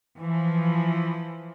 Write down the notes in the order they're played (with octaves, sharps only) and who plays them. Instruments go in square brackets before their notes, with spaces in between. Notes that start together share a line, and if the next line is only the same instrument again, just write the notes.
[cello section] E3 F3